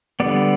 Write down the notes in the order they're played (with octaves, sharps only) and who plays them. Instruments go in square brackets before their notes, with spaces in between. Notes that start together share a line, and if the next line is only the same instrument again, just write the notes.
[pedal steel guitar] D3 G3 B3 D5